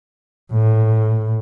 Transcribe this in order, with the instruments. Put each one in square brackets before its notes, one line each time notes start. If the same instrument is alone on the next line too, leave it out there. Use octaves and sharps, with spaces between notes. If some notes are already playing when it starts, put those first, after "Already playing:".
[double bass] A2